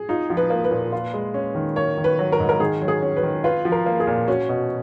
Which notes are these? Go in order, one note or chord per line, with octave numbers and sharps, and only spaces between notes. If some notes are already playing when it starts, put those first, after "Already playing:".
Already playing: G#4
D#4 F4
F3
B4
A#3
B4
A#2
F4
G#3
C#4
D#3
A#3 C#5
D#3
B4
F#3
A#4
G#2
A#4
D#3 G#4
F#3
G#4
C#4
B4
D#3
F4 B4
F3
A#4
A#3
G#4
A#2
C#4 F#4
B2